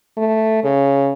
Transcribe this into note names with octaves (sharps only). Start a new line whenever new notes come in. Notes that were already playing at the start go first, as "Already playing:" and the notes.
A3
C#3